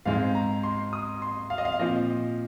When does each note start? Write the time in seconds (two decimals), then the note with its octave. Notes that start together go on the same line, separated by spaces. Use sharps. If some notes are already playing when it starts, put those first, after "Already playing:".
0.05 G#2 G#3 C4 F5
0.35 A#5
0.63 C6
0.93 D#6
1.22 C6
1.50 F5
1.58 D#5
1.65 F5
1.79 A#2 F3 C4 D#5